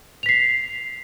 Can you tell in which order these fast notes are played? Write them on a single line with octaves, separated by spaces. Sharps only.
F7 B6 C7